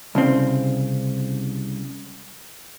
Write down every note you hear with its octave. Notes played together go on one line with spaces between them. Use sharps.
C2 C#3 C4